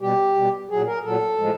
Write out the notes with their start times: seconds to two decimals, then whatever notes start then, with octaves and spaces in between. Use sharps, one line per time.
0.01 B2 G3 G4
0.36 B2 G3
0.70 A#2 F#3 G#4
0.87 A#4
1.04 A#2 F#3 A4
1.38 A2 F3 G#3